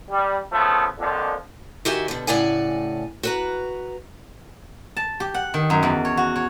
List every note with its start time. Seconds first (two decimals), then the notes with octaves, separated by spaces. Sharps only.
0.11 G3
0.53 C#3 F3 A3 B3
0.98 A#1 F2 D3 F3
1.85 D#3 F#4 G4 E5 G#5
2.08 B2 D3
2.27 A2 C#3 D5 F#5 G#5
3.23 F#4 B4 A#5
4.96 A5
5.20 G4
5.34 F#5
5.54 D#3
5.70 F#2
5.83 E2
6.05 C#5
6.17 F#4
6.36 C#5